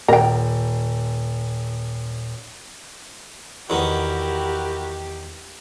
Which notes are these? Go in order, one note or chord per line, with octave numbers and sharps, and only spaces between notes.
D#1 A#4 G5
E2 D#3 B3 E4 F#4 G4 A#4